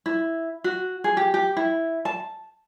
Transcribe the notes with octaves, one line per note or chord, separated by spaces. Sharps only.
E4
F#4
G#4
G4
G4
E4
A5